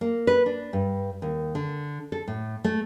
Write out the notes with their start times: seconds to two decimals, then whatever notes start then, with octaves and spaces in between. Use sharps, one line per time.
0.01 A#3
0.27 B4
0.46 D4
0.73 G2
1.22 D#2
1.55 D3
2.12 A4
2.28 A2
2.64 A3